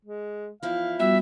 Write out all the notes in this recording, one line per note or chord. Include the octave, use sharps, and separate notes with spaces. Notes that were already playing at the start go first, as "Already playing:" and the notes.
G#3
E2 F3 E4 F5
G3 B3 F#4 E5